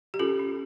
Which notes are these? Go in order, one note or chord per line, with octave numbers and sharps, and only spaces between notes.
G4
C#4 F4 A4
C#4